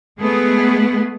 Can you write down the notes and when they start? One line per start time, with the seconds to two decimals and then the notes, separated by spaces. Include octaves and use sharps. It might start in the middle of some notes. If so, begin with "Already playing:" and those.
0.19 G#3 A3 B3 G#4